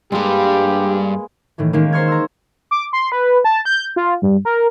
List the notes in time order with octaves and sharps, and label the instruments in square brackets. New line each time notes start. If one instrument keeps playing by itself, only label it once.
[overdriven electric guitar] G2 G3 [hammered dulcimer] G#3 A#3 B4 [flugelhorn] G4
[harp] A2 D#3 E3
D#3 G#3 A#3 C#4
C5 A#5 C6 C#6 F6 G#6
A#5 E6
[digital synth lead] D6
C6
B4
A5
G6
F4
G2
A#4